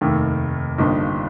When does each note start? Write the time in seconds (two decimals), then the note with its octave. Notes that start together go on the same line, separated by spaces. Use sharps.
0.01 F1 D#2 D#3 A3
0.78 G1 G2 F3 A#3 D#4